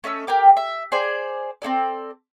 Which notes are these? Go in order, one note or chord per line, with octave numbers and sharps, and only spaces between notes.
A3 C#4 D#5 E6
G4 A#4 G5 D6
E5
G#4 C5 D5
C4 D#4 A4 D5